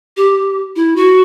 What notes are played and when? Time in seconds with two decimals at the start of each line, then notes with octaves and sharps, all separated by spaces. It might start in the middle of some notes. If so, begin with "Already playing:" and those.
0.17 G4
0.76 E4
0.96 F#4